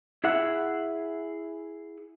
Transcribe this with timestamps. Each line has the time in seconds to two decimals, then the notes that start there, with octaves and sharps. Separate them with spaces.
0.24 E4 G#4 E5 F#5